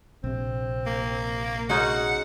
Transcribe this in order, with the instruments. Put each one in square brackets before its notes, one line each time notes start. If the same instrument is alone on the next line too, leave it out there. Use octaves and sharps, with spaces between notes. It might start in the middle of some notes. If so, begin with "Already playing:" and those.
[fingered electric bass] A#1 C3 [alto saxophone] C4
[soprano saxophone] A#3
[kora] G#3 C#4 D#4 [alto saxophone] F#4 [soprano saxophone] F#5